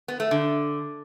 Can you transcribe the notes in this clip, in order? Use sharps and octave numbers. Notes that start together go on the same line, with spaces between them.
B3
A3
D3